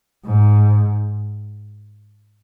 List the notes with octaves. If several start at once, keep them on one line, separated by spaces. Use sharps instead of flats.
G#2